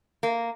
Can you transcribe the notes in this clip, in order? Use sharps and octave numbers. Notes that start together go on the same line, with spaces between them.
A#3